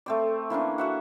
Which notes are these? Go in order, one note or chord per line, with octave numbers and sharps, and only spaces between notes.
A3 C4 D5
E3 A#3 C#4 D4
F#4 E5 F#5